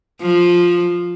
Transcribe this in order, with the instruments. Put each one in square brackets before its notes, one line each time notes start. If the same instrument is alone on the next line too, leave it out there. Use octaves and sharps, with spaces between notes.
[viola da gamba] F3